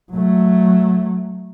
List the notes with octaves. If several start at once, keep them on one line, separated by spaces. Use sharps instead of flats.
F#3 A3